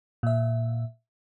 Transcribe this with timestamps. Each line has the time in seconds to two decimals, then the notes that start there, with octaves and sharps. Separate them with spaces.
0.23 A#2 E5